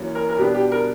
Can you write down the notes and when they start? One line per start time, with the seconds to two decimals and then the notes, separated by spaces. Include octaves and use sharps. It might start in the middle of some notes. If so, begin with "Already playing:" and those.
Already playing: F#2 E3 A#3 C#4
0.15 A#4
0.29 A#4
0.37 B2 G3 B3 D4 G4
0.54 G4
0.72 A#4